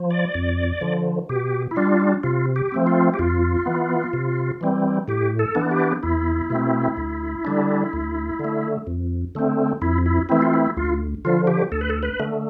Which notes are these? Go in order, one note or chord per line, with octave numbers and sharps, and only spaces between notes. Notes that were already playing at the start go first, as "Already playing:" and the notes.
Already playing: F3
D5
F2
D3 F3
B2 G4
E4
G3 D4 F4
C3 F4
G4
F3 A3 C4
F4
G4
F2 F4
E3 B3
C3
E3 G3 C4
A2 G4
A4
E3 B3 D4
G4
E2 E4
B2 A3 C4
D2
D3 G3 D4
D2
D3
A3
F2
D3 A3 C4
F2 E4
E4
E3 A3 C4 E4
F4
E4
D2 F4
D3 F3 F4
G4
D2 A4
B4
A4
B4
D3 A3